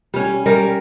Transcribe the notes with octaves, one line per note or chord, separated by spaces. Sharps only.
G3 C#4
G3 A#4